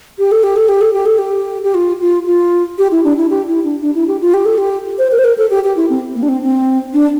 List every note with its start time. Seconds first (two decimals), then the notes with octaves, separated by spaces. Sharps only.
0.19 G4
0.32 A4
0.43 G4
0.56 A4
0.69 G4
0.81 A4
0.93 G4
1.06 A4
1.19 G4
1.64 G4
1.75 F4
2.01 F4
2.27 F4
2.78 G4
2.91 E4
3.04 D4
3.17 E4
3.30 G4
3.48 E4
3.64 D4
3.82 D4
3.95 E4
4.08 G4
4.21 F4
4.34 G4
4.46 A4
4.58 G4
4.98 C5
5.11 A#4
5.19 C5
5.24 A#4
5.38 A4
5.51 G4
5.64 G4
5.77 E4
5.90 C4
6.15 A#3
6.23 D4
6.29 C4
6.42 C4
6.93 D4